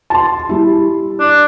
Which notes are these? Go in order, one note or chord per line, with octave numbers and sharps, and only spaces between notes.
A5 C6
G3 E4
D4